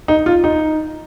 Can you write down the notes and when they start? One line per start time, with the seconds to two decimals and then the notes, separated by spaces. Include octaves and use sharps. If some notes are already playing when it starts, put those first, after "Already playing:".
0.08 D#4
0.26 F4
0.44 D#4